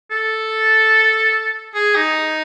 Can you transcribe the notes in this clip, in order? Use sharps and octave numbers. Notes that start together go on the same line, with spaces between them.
A4
G#4
D#4